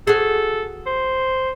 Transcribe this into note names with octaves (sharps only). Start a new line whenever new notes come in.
F#4 G#4 A4
C5